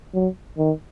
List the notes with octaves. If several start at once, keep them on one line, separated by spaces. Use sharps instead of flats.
F#3
D#3